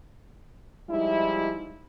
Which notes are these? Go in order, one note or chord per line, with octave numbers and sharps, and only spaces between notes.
F3 G3 G#3 D#4 E4